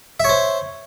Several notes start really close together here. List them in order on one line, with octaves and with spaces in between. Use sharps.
E5 C#5 C5